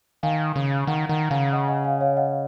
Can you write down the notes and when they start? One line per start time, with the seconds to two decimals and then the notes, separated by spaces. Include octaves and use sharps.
0.23 D#3 F5 G#5
0.56 C#3
0.87 D#3 F#5 A#5
1.09 D#3 F#5 A#5
1.30 C#3 F5 G#5
1.52 D#5 F#5
1.68 D#5 F#5
1.84 F5 G#5
2.01 C#5 F5
2.17 D#5 F#5